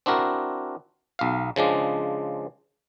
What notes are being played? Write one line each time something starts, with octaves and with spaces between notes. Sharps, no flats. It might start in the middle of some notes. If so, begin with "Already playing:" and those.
C4 D4 E4 F#4 A#4
B1 F5
C#3 F3 G#3 D4